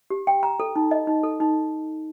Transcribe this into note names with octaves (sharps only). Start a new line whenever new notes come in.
G4
G5
A#5
A4
D#4
D#5
D#4
A4
D#4